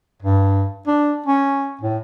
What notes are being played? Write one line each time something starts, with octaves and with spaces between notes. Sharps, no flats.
G2
D4
C#4
A2